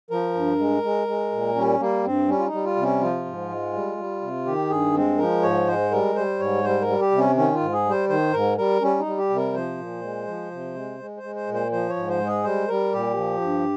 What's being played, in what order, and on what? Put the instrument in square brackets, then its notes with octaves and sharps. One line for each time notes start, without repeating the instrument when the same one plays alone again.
[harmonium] F3 A#4
G2
G#3
G#3
G#3
A#2
G3 C#4
G3 A#3
G2 C4
G3 C#4
F4
D#4
G3
F4
C3
C#4
F3 F4
G#2
G#3
G3
G3
C3
D#3 G4
G2 G#4
G#3 C4
F3 A#4
G#2 C#5
G#3 C5
G3 A#4
G3 C5
G#2 C#5
G3 C5
A#4
G3
G4
C3
C#4
D#3 C#4
F4
G#2
G#4
G3
C5
D#3 C5
G#2 A#4
G3 A#4
G3 C#4
D#4
G3
G4
C3
A#4
F3 C5
A#2
G#3
F3
C3
G#3
G#3
C5
G#3
C5
A#2
C5
F3 C5
C#5
G#2
C5
G#3
G#4
G3 C5
G3 A#4
A#2 G4
F3
G2